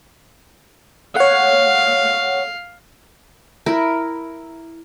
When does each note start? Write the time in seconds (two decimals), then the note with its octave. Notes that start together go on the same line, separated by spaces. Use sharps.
1.16 C#5 F5 F#5
3.66 E4 A#4